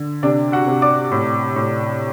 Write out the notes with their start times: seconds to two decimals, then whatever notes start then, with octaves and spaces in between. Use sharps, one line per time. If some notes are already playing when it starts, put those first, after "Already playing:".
Already playing: D3
0.23 C3 D4 D5
0.52 F#4 F#5
0.67 C3
0.82 D5 D6
1.12 A2
1.56 A2